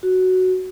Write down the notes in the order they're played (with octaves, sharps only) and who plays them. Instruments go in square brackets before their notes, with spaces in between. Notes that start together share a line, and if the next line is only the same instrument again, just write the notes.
[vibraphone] F#4